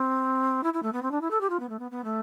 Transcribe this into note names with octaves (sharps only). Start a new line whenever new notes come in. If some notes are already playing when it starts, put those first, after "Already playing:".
Already playing: C4
E4
E4
A3
B3
C4
D4
E4
A4
G4
F4
B3
A3
B3
B3
A3